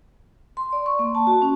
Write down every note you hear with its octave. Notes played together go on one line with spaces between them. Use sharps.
C6
D5
C#6
A#3
A5
F#4
C#4